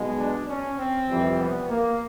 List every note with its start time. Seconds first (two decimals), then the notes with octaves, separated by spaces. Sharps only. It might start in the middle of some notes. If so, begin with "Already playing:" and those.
Already playing: B1 B2 G#3
0.17 D4
0.48 C#4
0.78 C4
1.08 F2 C3 E3 G3
1.39 B3
1.69 A#3